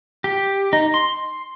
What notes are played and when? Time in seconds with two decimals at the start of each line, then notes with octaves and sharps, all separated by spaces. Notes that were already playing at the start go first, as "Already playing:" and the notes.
0.24 G4
0.73 D#4
0.94 C6